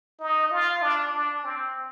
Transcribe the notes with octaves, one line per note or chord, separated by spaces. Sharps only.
D#4
F4
D4
D4
C4